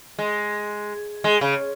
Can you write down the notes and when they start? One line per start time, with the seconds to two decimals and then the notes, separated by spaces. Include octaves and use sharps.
0.19 G#3
1.24 G#3
1.41 C#3